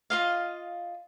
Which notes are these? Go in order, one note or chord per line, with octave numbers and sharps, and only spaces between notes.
F4 D#5 F5